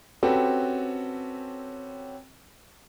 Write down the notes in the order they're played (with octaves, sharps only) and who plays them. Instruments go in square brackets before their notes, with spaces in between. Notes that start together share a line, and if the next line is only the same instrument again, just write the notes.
[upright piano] C4 C#4 F#4 G4 A4 B4